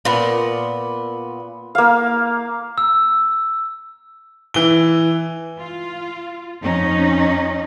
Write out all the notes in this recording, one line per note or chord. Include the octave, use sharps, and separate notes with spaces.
A#2 B3
A#3 F5
E6
E3 G7
F4
F2 C#4 D#4